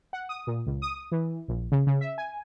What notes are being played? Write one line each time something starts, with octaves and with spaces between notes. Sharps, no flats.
F#5
D#6
A#2
C#2
D#6
E3
A#1
C#3
C#3
E5
G#5